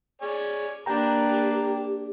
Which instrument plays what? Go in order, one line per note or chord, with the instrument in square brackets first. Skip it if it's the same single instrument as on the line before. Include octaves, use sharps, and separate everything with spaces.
[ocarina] G#4 [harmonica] C#5 D5 G#5
[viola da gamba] A#3 D4 [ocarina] G4 [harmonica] B4 [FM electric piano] G5 A#5